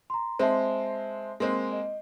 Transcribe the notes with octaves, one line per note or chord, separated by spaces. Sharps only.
A#5 C6
G#3 C4 C5 E5 A5
G#3 A#3 C4
D#5